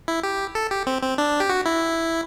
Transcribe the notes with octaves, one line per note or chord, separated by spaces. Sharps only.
E4
G4
A4
G4
C4
C4
D4
G4
F#4
E4